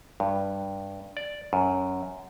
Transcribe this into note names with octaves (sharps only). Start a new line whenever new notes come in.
G2
D5
F#2